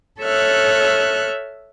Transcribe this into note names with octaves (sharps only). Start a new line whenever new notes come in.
A4 C#5 E5 F6 F#6